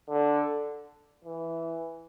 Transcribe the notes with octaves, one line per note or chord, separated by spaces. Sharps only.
D3
E3